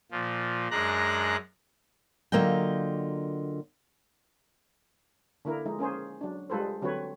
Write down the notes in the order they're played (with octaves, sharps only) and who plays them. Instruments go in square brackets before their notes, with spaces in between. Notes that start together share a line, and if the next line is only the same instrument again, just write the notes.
[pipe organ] A#2 F3
F#2 G#3 D4 A#5 F#6
[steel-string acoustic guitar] D3 F#3 A#3 F4 D#5 G5
[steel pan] D3 A#3 E4 A#4
F3 G#3 D#4
A#3 C#4 G#4 C5
F#3 D4
G3 G#3 F4 A4 B4 C5
D3 F#3 C4 F#4 B4 C#5